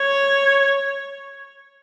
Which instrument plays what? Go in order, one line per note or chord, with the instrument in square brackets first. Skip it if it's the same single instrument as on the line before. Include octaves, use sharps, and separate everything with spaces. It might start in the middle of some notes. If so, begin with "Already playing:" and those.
Already playing: [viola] C#5